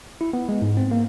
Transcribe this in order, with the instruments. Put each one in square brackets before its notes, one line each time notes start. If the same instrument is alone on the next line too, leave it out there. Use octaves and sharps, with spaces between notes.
[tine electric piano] E4
B3
G#3
G#2
C4
A#3